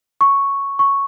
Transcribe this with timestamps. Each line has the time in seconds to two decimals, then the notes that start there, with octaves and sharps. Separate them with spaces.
0.21 C#6
0.79 C#6